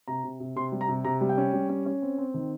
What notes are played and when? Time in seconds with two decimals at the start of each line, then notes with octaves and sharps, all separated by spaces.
0.08 C3 A#5
0.24 C3
0.40 C3
0.56 C3 C6
0.72 G3
0.81 A#5
0.89 C3
1.04 C3 A#5
1.21 G3
1.29 G5
1.38 C#4
1.53 G3
1.69 C#4
1.86 C#4
2.02 C4
2.18 C4
2.34 D#3